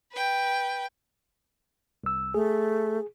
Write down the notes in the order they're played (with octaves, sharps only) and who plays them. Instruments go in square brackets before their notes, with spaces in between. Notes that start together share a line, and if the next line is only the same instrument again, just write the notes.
[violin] B4 G5
[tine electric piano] C2 E6
[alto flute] A3 [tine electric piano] G#4